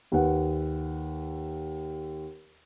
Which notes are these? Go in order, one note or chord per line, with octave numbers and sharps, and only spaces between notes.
D#2 B4 F#5